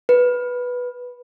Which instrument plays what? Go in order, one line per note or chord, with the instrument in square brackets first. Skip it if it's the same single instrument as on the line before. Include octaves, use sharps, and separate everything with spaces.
[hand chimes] B4